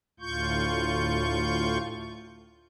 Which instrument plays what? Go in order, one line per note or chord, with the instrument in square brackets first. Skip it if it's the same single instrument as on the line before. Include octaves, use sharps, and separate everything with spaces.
[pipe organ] D2 A2 F4 C#6 G6